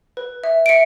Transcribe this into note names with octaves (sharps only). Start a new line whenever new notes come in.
B4
E5
D7
E5 C#7